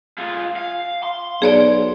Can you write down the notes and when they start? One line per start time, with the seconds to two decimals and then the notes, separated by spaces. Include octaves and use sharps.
0.18 F4 G#4
0.56 F5
1.03 C6
1.42 B1 G#4 C#5 D5